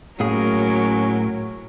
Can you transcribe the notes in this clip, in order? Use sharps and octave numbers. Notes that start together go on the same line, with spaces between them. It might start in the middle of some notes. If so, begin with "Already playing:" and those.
A2 F#3 A#3 C#4 G#4 A#4